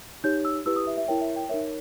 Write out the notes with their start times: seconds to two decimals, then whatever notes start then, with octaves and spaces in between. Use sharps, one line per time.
0.24 D#4 G4 C#5 G6
0.45 E6
0.66 E4 G4 B4 E6
0.76 D#6
0.87 E5
0.97 E5
1.08 E4 A#4 C#5 G5
1.21 E5
1.36 G5
1.49 D#4 A#4 C#5 E5